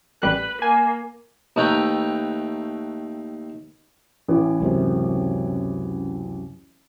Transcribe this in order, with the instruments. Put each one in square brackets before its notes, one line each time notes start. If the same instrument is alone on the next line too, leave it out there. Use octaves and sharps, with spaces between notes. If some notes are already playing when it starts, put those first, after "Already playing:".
[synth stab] A1 G3 F#6 [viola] B4
[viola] A#3 [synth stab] G#5
[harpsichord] D#2 A3 B4 G5 A#5
[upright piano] A1 E3
[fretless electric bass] C#2 F#2 C3